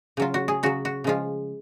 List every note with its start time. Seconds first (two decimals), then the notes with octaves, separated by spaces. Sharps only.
0.17 C#3 F#3 F4
0.34 F#4
0.48 G#4
0.63 C#3 F#3 F#4
0.85 F#4
1.04 C#3 F3 G#3 F4